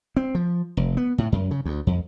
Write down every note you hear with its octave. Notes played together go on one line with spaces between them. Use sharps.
C4
F3
F1
B3
A2
F#2
C#3
D2
F2